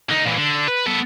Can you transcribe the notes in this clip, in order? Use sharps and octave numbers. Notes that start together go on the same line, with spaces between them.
D3 D#4
A#2 E3
D3
B4
B3 A4